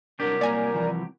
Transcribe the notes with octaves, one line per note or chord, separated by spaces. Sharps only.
C2 F#3 D4 G4 A#4
A#3 D5 G#5 A#5
E3 F3